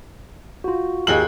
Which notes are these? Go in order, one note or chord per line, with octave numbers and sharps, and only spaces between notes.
F4 F#4
D#2 G#4 F#7